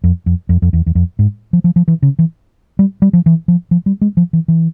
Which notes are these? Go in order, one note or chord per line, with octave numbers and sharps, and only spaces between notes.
F2
F2
F2
F2
E2
E2
F2
G#2
F3
F3
F3
E3
C#3
E3
G3
G3
F3
E3
F3
F3
G3
G#3
F3
E3
E3